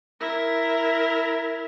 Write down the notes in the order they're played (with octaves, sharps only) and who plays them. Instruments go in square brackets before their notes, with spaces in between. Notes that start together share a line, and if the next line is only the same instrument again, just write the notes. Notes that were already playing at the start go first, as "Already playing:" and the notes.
[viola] E4 A#4